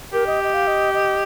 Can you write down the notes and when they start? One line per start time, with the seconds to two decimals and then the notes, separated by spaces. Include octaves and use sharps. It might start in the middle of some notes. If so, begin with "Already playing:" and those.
0.13 G4 A#4
0.27 D#5
0.44 D#5
0.54 F5
0.67 D#5
0.94 D#5